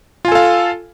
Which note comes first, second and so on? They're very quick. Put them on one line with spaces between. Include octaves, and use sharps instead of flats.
F4 G#5 A4 F5